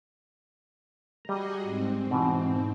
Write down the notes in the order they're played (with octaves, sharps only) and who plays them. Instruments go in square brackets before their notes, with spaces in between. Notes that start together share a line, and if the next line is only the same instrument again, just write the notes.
[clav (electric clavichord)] G3 A#5 [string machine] F#4 G#4 D#5
[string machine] G#2 C4
[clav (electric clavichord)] B2 E3